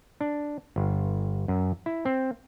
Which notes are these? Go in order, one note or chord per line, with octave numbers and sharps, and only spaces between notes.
D4
G1
F#2
E4
C4